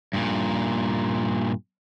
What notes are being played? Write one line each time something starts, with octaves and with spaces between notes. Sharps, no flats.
G2 A#2